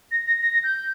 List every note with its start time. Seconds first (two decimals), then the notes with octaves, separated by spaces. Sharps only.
0.11 A#6
0.27 A#6
0.43 A#6
0.54 A#6
0.64 G6